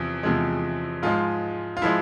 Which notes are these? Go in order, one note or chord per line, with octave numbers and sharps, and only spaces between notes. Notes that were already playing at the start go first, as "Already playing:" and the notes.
Already playing: E2 C3 F3
E2 C3 F3 G#3
G#2 F3 G#3 F4
F4
F3 G#3 E4